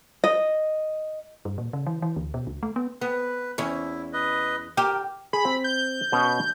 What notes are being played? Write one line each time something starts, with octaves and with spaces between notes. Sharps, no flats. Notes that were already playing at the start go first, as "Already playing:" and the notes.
D#5
G2
A#2
C#3
E3
E3
D2
B2
C#2
A3
B3
B3 B4
E2 C#4 E4
B4 D#5
G4 A#4
G#4 B5
C4
G6
B2 C#4 B4